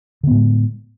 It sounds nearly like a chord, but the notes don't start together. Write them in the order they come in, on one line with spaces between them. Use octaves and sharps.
D3 B3 A2 G#3